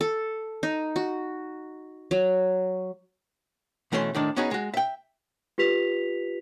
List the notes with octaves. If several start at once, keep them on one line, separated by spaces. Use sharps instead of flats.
A4
D#4
F#4
F#3
B2 E3 A3 C#4 A#4 C6
A2 D#3 D4
B3 C#4 D#4 F#4 G#4
G#3 F#4
E5 G5
F4 G4 B4 B6 F7